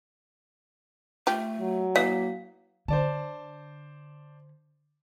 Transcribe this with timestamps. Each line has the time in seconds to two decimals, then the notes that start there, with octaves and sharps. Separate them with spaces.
1.27 A3 F4 G4
1.60 F#3
1.96 E3 A#3 F5
2.88 D3 C5 D5 A5